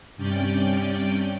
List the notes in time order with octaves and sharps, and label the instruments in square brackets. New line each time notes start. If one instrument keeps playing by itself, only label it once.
[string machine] G2 C3 C#4 D5 G5